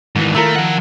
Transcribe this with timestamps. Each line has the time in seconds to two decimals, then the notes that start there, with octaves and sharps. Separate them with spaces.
0.16 G#2 D#3 E3
0.35 A3 E4 F4 A#4
0.56 F3 F#5